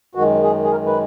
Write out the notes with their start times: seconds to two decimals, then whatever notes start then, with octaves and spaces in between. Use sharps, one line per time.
0.15 F#2 D#3 G#3 F#4
0.43 G#4
0.64 G#4
0.71 A#4
0.86 B4